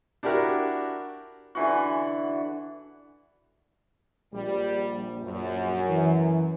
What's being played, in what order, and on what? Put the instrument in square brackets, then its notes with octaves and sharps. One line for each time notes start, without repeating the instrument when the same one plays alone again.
[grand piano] D4 E4 F#4 G4 A#4
[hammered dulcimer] D3 E3 F#4
[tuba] A#1 [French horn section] G3
[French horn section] F#2
[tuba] E3